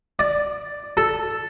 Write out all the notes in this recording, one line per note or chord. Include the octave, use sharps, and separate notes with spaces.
D5
A4